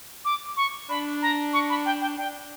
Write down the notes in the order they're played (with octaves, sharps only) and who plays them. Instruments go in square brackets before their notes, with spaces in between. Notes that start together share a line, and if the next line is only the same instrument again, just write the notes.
[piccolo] D6
C#6
[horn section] D4 [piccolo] B5
[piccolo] A#5
C#6
B5
G5
G5
[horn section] D4 [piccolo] G5